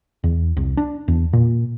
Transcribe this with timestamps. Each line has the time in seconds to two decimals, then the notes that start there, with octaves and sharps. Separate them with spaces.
0.24 E2
0.57 C2
0.77 D4
1.08 E2
1.33 A#2